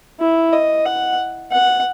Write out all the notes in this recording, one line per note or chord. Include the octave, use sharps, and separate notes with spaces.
E4
D#5
F#5
F#5